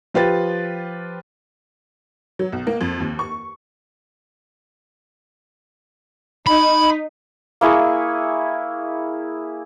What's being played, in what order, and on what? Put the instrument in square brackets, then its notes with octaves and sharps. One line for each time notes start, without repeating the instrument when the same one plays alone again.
[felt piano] F3 F4 G4 B4 A6
[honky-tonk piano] F#3
B1
A#3
F2
D#2
C#6
[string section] D#4 [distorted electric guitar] B5
[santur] A#3 E4 G#4 C#6